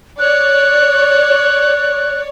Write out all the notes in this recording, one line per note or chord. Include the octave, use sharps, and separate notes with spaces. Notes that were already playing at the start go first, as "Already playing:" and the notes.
C#5 D5 F#6